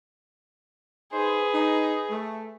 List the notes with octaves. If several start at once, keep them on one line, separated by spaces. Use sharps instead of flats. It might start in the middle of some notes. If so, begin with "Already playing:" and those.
D#4 G#4 B4 C5
D#4
A3